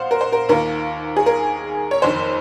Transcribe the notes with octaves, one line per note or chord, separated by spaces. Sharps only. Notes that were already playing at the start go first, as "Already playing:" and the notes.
Already playing: A#1 C5 F5 F#5
A#4
C5
A#4
D#2 D#3 A#3 F4 A#4
G#4
A#4
C#5
F#1 F2 D#3 C5